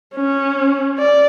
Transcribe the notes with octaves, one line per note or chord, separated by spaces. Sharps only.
C#4
D5